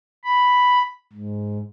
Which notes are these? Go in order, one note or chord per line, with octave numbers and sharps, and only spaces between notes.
B5
G#2